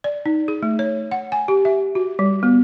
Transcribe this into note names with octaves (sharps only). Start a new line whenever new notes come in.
D5
D#4
G#4
A3
C#5
F#5
G#5
G4
E5
F#4
G3
B3